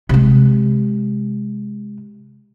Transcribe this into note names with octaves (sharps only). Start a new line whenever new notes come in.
C3 G#3